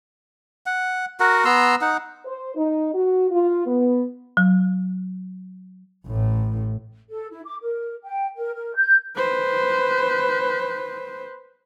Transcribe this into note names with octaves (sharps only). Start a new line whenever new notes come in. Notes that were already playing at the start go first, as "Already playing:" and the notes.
F#5
F#4 A#4 F#5
B3 A#5 C6 E6
D#4 F#5
C5
D#4
F#4
F4
B3
F#3
A1 A2
A4
E4
D6
A#4
G5
A#4
A#4
G6
B4 C5